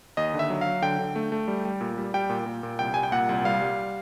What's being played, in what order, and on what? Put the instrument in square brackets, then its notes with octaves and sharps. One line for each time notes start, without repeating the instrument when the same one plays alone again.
[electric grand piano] D#2 D#5
D3
E5
F#3
F#3 F5
D3 G5
D3
A3
A3
G3
G3
A#2
G3
G3 G5
A#2
A#2
A#2
C2 G5
G3 G#5
G5
A#2 F#5
C2
G3 F5
G3